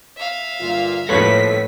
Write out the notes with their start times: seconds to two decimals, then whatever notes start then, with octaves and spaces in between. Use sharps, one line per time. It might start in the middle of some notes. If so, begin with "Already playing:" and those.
0.16 E5 F5
0.60 G1 A#2 F4
1.09 A2 F3 A#3 A4 B4 C#5 B6